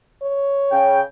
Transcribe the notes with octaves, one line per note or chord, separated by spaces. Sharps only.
C#5
C#3 G5